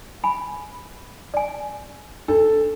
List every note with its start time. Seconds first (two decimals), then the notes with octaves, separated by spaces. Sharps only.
0.24 G#5 B5
1.34 D5 G#5
2.28 D4 A4